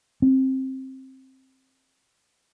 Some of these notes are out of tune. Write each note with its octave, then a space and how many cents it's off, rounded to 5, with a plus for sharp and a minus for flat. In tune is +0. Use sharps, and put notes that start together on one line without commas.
C4 +15